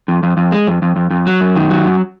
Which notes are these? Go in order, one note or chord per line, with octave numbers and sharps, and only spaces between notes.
F2
F2
F2
G#3
F2
F2
F2
F2
F#3
F#2
D#3
F#3
F#2